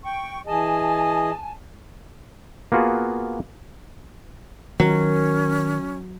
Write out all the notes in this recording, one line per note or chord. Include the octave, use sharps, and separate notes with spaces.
G5 C#6
E3 G#4 D#5 G#5 A5
A#3 B3 F4 F#4 G#4
D#3 F#3 C#4